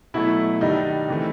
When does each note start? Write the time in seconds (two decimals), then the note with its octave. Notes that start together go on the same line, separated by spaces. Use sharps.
0.14 B2 F#3 A3 E4
0.61 G2 D#3 G3 D#4
1.08 C3 E3 A3